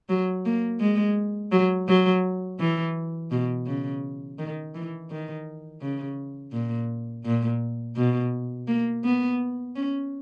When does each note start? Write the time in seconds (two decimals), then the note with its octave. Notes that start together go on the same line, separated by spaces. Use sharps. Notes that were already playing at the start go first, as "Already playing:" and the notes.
0.09 F#3
0.46 A#3
0.80 G#3
1.52 F#3
1.88 F#3
2.60 E3
3.31 B2
3.67 C#3
4.39 D#3
4.75 E3
5.11 D#3
5.81 C#3
6.53 A#2
7.25 A#2
7.96 B2
8.68 A#3
9.04 B3
9.76 C#4